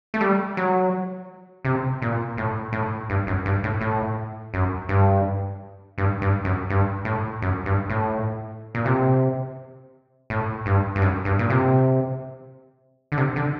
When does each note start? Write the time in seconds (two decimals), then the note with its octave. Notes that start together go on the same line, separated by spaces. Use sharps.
0.14 A3
0.21 G3
0.57 F#3
1.65 C3
2.02 A#2
2.37 A2
2.73 A2
3.10 G2
3.27 F#2
3.46 G2
3.64 A2
3.81 A2
4.54 F#2
4.89 G2
5.98 G2
6.22 G2
6.45 F#2
6.70 G2
7.05 A2
7.42 F#2
7.66 G2
7.90 A2
8.75 A#2
8.85 C3
10.30 A2
10.66 G2
10.96 G2
11.02 F#2
11.25 G2
11.39 A#2
11.50 C3
13.12 D3
13.17 C3
13.36 D3